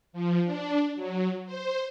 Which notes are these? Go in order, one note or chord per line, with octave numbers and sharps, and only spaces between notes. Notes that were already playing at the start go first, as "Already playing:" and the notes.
F3
D4
F#3
C5